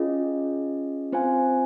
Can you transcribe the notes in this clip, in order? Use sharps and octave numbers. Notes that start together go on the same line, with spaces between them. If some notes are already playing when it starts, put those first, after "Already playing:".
Already playing: C#4 F4 G#4 D#5
C4 F4 C5 F5 G#5